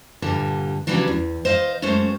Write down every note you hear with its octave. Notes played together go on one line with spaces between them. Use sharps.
G2 A#2 D3 G3
C#3 E3 F#3 G3 D4
E2
C5 D#5 F5
F#2 G#3 A3 C#4 C5